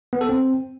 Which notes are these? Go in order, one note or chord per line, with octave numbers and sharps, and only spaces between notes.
B3
A4
C4